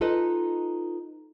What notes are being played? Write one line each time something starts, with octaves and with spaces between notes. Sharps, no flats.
D#4 F4 A4 B4 D#5